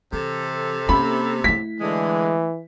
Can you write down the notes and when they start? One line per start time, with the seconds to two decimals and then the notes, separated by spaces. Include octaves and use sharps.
0.13 C3 E3 A4
0.89 A#3 C#4 B5
1.44 A3 E4 B6
1.80 D3 E3 G#3